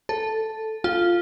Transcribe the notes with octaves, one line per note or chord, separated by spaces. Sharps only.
A4
F4